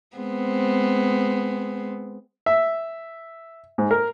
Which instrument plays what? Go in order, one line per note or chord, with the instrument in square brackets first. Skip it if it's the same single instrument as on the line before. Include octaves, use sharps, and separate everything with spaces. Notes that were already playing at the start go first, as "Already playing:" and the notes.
[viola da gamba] G#3 B3 C4
[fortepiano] E5
G#2
A#4